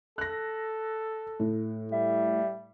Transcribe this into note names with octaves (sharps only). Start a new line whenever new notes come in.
A4 F#6 A#6
A2
G3 E5